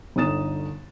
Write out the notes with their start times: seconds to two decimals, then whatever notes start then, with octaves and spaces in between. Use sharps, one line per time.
0.16 G1 D3 D#4 D#6 A6 E7